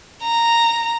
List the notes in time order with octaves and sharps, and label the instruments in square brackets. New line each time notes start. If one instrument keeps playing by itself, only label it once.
[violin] A#5